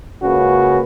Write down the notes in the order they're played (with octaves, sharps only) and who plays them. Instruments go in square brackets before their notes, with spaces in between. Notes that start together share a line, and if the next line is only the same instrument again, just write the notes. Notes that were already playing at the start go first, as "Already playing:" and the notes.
[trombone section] C#2 C#3 A#3 C#4 F#4 B4